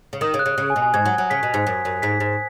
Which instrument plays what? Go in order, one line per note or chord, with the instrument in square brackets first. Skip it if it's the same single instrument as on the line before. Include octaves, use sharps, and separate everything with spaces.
[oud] C#3
[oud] D#3 [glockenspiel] D#6
[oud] C#3
[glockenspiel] F#6
[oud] C#3
C#3
[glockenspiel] G#5
[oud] B2
[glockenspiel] G#5
[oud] G#2 [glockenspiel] G#6
[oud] F#3
F#3
[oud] C#3 [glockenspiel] B6
[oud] B2
G#2
F#2
F#2
[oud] G#2 [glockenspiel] B6
[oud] G#2